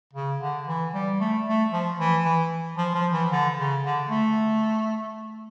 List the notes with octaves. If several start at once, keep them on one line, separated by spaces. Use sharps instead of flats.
C#3
D3
E3
G3
A3
A3
F3
E3
E3
F3
F3
E3
D3
C#3
D3
A3